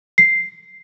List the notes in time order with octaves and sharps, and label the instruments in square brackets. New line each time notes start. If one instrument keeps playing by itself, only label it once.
[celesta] C7